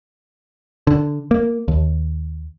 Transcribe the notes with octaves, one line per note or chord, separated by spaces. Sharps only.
D3
A#3
D#2